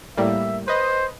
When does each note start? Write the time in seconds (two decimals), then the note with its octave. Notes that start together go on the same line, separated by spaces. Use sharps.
0.17 A2 G3 A#3 E5
0.68 B4 C5 D#5